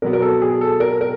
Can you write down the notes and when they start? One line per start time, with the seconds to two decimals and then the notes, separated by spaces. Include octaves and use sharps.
0.02 B2 F#3 B3 A#4
0.13 A#4
0.22 A4
0.42 G#4
0.61 A4
0.80 A#4
1.01 A#4